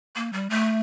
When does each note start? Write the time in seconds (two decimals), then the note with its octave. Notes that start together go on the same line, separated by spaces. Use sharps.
0.16 A#3
0.33 G3
0.50 A3